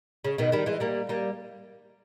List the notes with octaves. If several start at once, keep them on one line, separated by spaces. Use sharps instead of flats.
C#3
B2 D#3
D#3 G3
E3 G#3
G3 A#3
G3 A#3